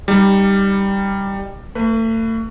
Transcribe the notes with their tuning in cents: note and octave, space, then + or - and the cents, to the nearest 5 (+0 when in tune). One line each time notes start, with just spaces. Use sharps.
G3 +5 D#4 -5
A3 +40 B4 +5